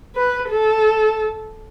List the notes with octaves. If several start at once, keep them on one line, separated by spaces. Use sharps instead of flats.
B4
A4